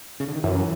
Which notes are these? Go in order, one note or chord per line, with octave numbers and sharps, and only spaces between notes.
C#3
D3
D#3
F#2 E3